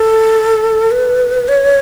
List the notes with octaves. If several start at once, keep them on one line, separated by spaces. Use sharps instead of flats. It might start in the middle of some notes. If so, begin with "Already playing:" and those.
Already playing: A4
B4
C#5